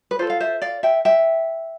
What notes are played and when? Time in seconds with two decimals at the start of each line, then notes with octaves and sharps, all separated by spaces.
0.11 B4
0.19 F4 A4 C5
0.30 F5
0.40 C5 E5
0.62 D5 F5
0.83 E5 G5
1.05 E5 G5